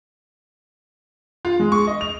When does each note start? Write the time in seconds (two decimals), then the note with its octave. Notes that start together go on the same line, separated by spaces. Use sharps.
1.45 F4
1.60 G#3
1.72 C#6
1.87 D#5
2.01 F7